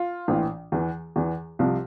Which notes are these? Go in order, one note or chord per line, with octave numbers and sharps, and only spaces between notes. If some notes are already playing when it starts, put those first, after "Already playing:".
Already playing: F4
A#1 A2 E3
E2 E3
E2 E3
C2 C3 F3